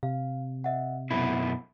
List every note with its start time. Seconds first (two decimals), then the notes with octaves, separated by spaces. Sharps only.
0.03 C3 F5
0.64 D#5 E5 F#5
1.11 F#2 B2 E4 B5